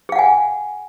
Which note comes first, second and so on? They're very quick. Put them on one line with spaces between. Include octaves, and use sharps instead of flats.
G#4 F5 F#5 G#5